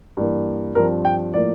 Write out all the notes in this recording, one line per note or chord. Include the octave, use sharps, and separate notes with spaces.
G2 E3 A#3
G2 F3 C4 A#4
G5
A2 F3 A#3 D5